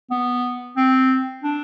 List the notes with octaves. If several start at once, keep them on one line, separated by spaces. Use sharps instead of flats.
B3
C4
D4